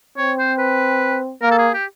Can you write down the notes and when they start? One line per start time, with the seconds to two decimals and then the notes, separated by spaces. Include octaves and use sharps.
0.17 C4 C#5
0.39 C5
0.59 B4
1.42 A#3 A#4
1.51 A4
1.58 G#4
1.74 G4